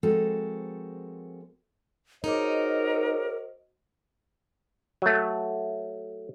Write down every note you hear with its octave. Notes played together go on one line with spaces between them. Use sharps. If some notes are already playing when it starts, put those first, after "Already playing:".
F3 G#3 C4 F#4 A4 A#4
D#4 F#4 G#4 A#4 C5 C#5 D#5 D6
F#3 A3